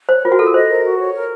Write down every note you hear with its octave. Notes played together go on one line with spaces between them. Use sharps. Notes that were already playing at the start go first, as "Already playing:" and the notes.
C5 C#5
F4 A#4
F#4
F4 A4
A#4
C5 D#5
A#4
F#4
C#5
A#4